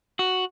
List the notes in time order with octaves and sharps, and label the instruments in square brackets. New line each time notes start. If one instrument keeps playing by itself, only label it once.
[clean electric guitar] F#4